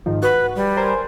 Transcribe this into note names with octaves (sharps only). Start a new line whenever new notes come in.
G#2 D#3 F3
F#4 B4
G3
A#4 C5 G#5